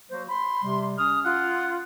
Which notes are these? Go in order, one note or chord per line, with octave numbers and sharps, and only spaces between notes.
F#3 A#3 F#4 C5
B5 C6
C3 G3
C#4 D#6 F6
F4 F#5